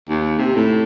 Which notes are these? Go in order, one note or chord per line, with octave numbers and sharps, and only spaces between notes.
D#2
C3
A2